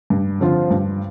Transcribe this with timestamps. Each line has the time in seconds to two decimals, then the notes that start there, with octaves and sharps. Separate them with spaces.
0.10 G2
0.40 D3 F3 C4 F4
0.71 G2